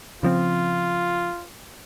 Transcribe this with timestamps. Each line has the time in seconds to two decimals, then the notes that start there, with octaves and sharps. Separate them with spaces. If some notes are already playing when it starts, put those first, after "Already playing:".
0.23 C#3 F3 C4 F4